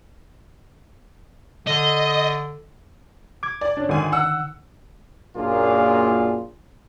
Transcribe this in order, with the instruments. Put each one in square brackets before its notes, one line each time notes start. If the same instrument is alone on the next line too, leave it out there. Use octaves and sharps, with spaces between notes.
[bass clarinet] D3 [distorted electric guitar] D#5
[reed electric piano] D6 G#6
[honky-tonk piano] D5
C#4 D4
[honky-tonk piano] G#1 G#5 [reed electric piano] D3 D#3
[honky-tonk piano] F#5 E6
[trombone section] F#2 A#2 A#3 D4 F4 G#4